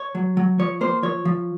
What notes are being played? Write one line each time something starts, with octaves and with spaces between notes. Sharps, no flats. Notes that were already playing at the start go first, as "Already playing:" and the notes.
Already playing: C#5
F#3
F#3
F3 C#5
A#3 C5
F3 C#5
F3